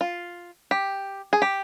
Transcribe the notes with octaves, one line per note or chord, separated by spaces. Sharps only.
F4
G4
G#4
G4